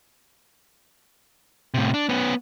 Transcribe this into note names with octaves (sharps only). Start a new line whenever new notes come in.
A2 C3
D4
B3 C#4